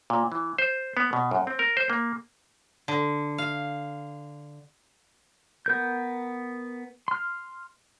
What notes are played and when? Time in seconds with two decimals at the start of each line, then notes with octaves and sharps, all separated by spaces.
0.10 A#2
0.32 E3
0.58 C5
0.97 B3
1.13 B2
1.31 F#2
1.47 C4
1.59 A#4
1.77 C5
1.90 A#3
2.88 D3
3.38 F5
5.66 B3 A#4 G6
7.08 C6 F6